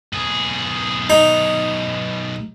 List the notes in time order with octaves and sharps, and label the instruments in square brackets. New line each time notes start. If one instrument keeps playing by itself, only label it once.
[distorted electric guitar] B1 G#4
[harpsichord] D#4